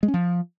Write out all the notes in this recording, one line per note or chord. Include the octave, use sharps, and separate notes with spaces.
G#3
C#4
F3